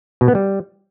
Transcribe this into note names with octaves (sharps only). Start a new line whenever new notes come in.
B2
B3
G3